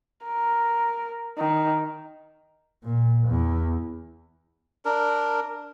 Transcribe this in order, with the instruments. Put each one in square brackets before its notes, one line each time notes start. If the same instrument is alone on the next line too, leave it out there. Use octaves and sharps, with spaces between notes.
[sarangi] A#4
D#3
[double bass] A#2
E2
[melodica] D4 A#4